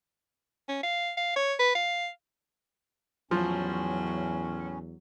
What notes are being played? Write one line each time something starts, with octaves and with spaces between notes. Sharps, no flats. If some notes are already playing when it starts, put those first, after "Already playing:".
C#4
F5
F5
C#5
B4
F5
E2 A2 F3 F#3 C#4